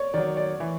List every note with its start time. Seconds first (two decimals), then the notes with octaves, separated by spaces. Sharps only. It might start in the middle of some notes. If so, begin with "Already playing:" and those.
Already playing: C#5 D5
0.14 D#3 F#3 D5
0.37 D5
0.60 E3